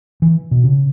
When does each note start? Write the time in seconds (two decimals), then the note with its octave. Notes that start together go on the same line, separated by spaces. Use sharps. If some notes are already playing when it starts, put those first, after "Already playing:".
0.22 E3
0.51 B2
0.64 C#3